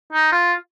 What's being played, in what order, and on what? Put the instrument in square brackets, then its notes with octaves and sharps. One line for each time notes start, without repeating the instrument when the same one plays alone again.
[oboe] D#4
F4